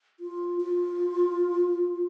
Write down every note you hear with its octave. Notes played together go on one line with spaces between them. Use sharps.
F4
F4